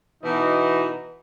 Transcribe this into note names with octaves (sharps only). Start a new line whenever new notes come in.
B2 E3 D#4